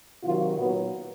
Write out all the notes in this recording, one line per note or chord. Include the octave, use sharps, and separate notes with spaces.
C3 D#3 F#3 F4
A#2 F#3 B3